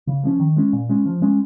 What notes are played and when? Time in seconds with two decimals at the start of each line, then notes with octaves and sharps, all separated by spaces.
0.07 C#3
0.24 F3 A#3 C#4
0.40 D#3
0.57 G#3 C#4
0.73 A#2
0.89 G#3 C#4
1.06 F3
1.22 G#3 C#4